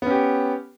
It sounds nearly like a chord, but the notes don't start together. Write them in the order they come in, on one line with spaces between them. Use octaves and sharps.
B3 C#4 G4